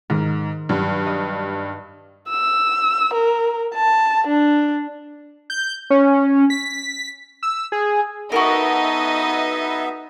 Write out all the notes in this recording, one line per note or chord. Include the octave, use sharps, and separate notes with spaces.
G#2 D#3 A#4
G2 F#3
D#5
E6
A#4
A5
D4
G6
C#4
B6
E6
G#4
B3 D#4 F#4 A4 A#4 D#5 E5